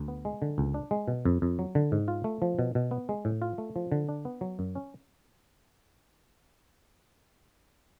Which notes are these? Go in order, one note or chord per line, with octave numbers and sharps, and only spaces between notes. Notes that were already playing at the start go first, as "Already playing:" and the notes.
Already playing: D2
B3
G#3
D3
C#2
D4
G#3
B2
F2
F2
F#3
D3
G#2
F4
A3
F3
B2
B2
B3
G#3
A2
F4
A3
F3
D3
D4
B3
F#3
F#2
C#4